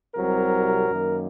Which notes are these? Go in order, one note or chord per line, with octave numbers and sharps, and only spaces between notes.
C2 C3 F#3 A#4
F#2 D#3 A#3